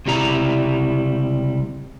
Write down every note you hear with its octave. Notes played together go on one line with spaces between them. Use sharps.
C#2 C3 G3 E4 A#5